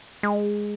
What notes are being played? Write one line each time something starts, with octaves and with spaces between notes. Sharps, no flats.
G#3